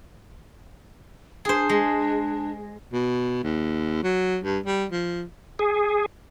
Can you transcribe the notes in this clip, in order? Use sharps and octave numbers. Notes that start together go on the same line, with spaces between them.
D4 G#4 C5
G#3
B2
D#2
F#3
G2
G3
F3
G#4